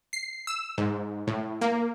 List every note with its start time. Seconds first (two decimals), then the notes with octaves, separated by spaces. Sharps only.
0.13 C7
0.47 E6
0.78 G#2
1.27 A2
1.61 A#3